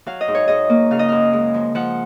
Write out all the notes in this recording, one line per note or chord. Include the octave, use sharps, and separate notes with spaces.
F#3 F5
D#5
G#2
C#5
G#2 D#5
A#3
C#3 F5
D#5
F#2 F5
G#3
F3
F3 F#5